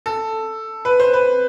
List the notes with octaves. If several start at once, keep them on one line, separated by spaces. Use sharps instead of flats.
A4
B4
C5
B4